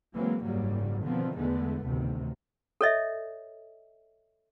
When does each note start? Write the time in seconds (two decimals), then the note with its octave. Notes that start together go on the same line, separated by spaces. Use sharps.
0.14 E3 F#3 G#3 A#3 C4
0.44 F#1 G#2 F#3 G3 A#3
1.03 B2 D3 D#3 F3 B3 C4
1.37 E2 D3 G#3 A3 B3
1.84 A1 D2 C3 D#3
2.81 A4 C#5 D#5 E5